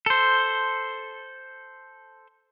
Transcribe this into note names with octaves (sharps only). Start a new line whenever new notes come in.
A4 C5